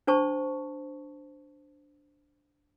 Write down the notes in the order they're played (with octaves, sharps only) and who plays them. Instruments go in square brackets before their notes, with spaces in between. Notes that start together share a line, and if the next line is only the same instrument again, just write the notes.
[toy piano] D4 C5 A5 C#6